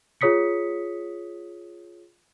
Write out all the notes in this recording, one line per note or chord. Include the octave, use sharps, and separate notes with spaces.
F4 G#4 C#5 D#6 B6 C#7